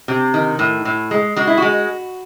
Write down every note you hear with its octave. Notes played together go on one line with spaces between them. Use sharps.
C3
D#3
A2
A2
G#3
G#3 F#4
E4
G#3 F#4